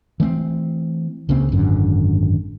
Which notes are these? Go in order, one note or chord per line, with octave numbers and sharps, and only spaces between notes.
E3 A3 B3 C4
C#2 C#3 A#3 C4
G#1 F#2 D3